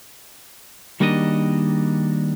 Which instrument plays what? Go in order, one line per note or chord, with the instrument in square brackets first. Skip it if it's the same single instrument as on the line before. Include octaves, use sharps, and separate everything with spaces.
[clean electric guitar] D#3 G3 A#3 D4 F#4 D#5